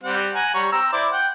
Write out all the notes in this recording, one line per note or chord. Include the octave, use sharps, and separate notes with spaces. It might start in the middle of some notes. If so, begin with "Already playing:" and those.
G3 C4 F#5
F#5 G#5 A#5
G3 C#5 A#5
C4 A#5 E6
E4 C5 D5
F#5 G5